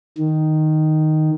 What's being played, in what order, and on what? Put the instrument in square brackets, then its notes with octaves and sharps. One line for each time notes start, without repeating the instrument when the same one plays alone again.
[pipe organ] D#3